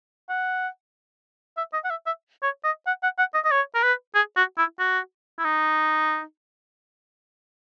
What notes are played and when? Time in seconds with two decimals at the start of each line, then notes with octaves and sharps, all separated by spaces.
0.29 F#5
1.57 E5
1.73 D#5
1.84 F#5
1.90 E5
2.06 E5
2.43 C#5
2.64 D#5
2.87 F#5
3.03 F#5
3.19 F#5
3.34 D#5
3.45 D#5
3.51 C#5
3.75 A#4
3.83 B4
4.15 G#4
4.37 F#4
4.58 E4
4.80 F#4
5.39 E4
5.44 D#4